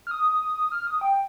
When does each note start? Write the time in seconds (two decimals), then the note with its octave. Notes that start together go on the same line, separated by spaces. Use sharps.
0.07 F6
0.11 D#6
0.72 F6
0.87 D#6
1.01 G5